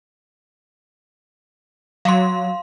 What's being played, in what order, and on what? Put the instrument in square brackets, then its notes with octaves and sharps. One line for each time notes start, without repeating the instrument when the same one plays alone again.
[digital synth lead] F#3 [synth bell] F5 C6